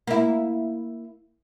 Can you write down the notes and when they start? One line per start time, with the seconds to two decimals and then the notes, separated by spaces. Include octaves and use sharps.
0.07 A#3 E4